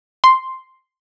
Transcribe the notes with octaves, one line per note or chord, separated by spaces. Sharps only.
C6